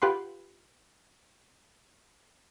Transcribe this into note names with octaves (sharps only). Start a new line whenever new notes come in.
F4 G4 B4 F#5 C6